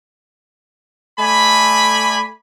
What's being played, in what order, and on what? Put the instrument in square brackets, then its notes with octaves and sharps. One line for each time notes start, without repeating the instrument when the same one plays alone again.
[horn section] A3 D5 G#5 B5